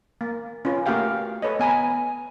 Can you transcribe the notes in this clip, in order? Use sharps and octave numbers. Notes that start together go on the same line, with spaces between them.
A#3
C#4 F4 B4
A3 A#3 F#4 G4 F5 G5
A4 B4 C#5 D#5
B3 G#5 A#5 B5